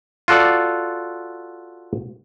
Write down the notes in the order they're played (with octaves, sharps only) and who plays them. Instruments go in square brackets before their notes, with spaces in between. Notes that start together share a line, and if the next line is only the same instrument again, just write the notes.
[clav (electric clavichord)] F4 F#4 A4 D5